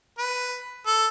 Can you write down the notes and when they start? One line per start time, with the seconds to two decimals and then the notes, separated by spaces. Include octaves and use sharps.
0.18 B4
0.86 A4